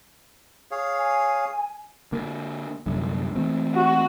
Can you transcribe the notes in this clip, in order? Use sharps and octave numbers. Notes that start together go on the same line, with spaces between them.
G#4 C#5 F5
G#5
D3 A#3
C2 F#2 D3
E3 A3 C4
F#4